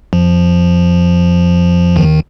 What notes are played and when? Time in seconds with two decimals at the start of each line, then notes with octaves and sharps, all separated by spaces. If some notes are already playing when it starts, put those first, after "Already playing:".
0.13 F2 F3
1.96 D#2 D#3